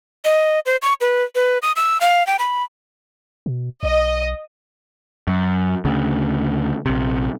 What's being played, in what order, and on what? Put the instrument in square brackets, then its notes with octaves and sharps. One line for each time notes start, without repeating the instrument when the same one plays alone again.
[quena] D#5
C5
C#6
B4
B4
D#6
E6
F5
G5
B5
[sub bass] B2
[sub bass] B1 [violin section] D#5
[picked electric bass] F#2
D2 C#3
A#1 C3